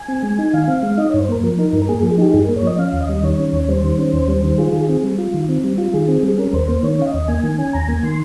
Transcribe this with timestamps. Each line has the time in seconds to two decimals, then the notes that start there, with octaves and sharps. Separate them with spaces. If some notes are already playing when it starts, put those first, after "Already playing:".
Already playing: G#5
0.08 C4
0.23 G#3
0.38 D#4
0.53 D#3 F5
0.68 C4
0.83 G#3
0.98 D#4 D#5
1.09 G2 C#5
1.21 C5
1.29 A#3 A#4
1.43 F3 A#4
1.59 D#4
1.73 G2
1.82 A#4
1.89 A#3 G#4
1.99 G#4
2.03 F3
2.11 G#4
2.18 D#4 G4
2.34 G2 G#4
2.44 A#3 A#4
2.56 C#5
2.63 F3 D#5
2.78 C#4 F5
2.93 D#2
3.01 D#5
3.09 G3
3.23 D#3 C#5
3.38 C#4
3.53 D#2
3.64 C#5
3.69 G3 C5
3.84 D#3
3.98 C#4
4.13 D#2
4.28 G3
4.44 D#3
4.58 F4 G#4
4.73 D#3
4.81 G#4
4.89 C4
5.03 G3
5.18 F4
5.34 D#3
5.49 C4
5.64 G3
5.78 F4
5.94 D#3 G#4
6.08 C4
6.23 G3
6.28 G#4
6.38 C#4 A#4
6.53 D#2 C5
6.68 A#3 C5
6.83 D#3 C#5
6.99 C#4 F5
7.06 D#5
7.14 D#2
7.28 A#3 G#5
7.43 D#3
7.58 C#4
7.73 D#2 A#5
7.88 A#3 G#5
8.03 D#3 C6